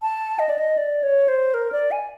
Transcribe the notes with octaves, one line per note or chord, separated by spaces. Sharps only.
A5
D#5
D5
D#5
D5
C#5
C5
A#4
D5
G#5